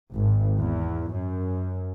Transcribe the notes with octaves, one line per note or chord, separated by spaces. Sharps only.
G#1
E2
F#2